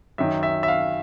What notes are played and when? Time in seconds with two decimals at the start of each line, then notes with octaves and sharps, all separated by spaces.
0.18 F#2 D#3 E5
0.43 E5
0.63 E5
0.68 F5